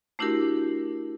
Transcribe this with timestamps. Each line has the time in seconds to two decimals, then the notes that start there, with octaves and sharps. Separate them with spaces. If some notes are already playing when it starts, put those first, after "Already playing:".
0.19 A3 D4 E4 F#4 G4 A#4